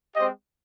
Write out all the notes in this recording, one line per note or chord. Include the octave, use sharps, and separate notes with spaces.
G#3 C4 G4 C5 D#5